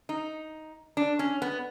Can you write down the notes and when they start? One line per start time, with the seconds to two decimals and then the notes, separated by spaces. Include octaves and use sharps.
0.09 D#4
0.97 D4
1.19 C#4
1.42 B3